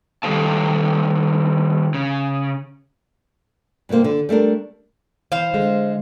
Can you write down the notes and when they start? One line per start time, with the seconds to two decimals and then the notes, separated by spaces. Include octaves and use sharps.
0.23 D#3 G3 A4 C5 F5 A5
1.94 C#3
3.89 G2 C3 D#3 A#3 C5
4.04 D3
4.29 G3 A3 D4 A#4
5.32 E3 C5 F5
5.54 D3 G#3